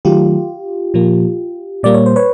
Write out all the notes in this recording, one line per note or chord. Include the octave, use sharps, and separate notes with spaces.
D#3 F#3 A3 F4 G4
A#2 F3 A#3
A#2 G3 A#3 D5
C#5
C5
B4 C#5